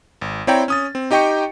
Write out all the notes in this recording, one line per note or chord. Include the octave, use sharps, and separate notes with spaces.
G#1
C4 E4 C#5 D5 G5 A#5
C#4 D#6 A6
C4
D#4 G4 D#5 G5 C#6 C#7